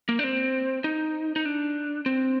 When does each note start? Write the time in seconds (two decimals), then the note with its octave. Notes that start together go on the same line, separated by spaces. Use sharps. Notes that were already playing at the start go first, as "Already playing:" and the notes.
0.09 A#3
0.19 D4
0.24 C4
0.84 D#4
1.36 D#4
1.45 D4
2.06 C4